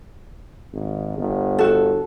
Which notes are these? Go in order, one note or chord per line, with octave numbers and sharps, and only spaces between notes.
G#1
G1
F#4 A4